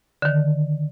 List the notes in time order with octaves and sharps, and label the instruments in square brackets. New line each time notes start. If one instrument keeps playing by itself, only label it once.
[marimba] D3 D#3